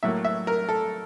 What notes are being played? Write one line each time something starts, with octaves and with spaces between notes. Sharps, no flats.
A2 F#3 A#3 E5
E5
A#4
A4